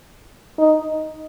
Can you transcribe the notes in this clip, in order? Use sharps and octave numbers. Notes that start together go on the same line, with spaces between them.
D#4